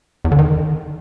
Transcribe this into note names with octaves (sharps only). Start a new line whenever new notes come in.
E2
D3
D#3